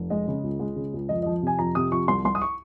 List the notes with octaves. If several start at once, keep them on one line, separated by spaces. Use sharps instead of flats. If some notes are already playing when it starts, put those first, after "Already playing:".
Already playing: F1
G#3 D#5
C#3
C#2
G#3
C#3
C#2
F2 D#5
D#5
F3
C3 G#5
F2 A#5
C3 D#6
F3 C#6
C2 C6
C2 C6
D#6
C#6